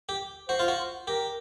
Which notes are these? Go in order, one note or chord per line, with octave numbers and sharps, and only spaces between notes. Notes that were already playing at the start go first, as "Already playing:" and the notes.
G4
F#4 C5
F4
F#4
G4 A#4